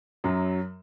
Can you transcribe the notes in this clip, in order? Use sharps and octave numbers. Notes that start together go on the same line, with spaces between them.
F#2 F#3